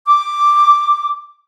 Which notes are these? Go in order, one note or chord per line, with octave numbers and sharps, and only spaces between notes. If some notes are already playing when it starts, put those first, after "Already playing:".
D6